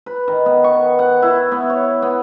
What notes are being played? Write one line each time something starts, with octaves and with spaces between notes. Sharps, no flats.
B4
D#3
B3
C#6
F#5
E4
B3
C#5
B3